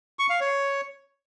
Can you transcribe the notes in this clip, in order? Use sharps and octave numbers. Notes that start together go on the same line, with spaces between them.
C#6
F5
C#5